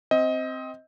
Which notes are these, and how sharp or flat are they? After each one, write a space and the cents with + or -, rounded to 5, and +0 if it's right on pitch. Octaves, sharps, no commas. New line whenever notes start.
C4 +0 D#5 +20